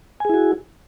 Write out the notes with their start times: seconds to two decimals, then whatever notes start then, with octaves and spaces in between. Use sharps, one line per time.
0.20 G#5
0.25 G#4
0.29 E4
0.34 F#4